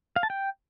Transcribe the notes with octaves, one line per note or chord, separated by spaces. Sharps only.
F5
A5
G5